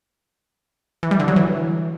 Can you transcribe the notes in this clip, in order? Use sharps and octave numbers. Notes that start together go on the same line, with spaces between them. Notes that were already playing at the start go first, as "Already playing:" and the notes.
E3
G3
D3
F#3
E3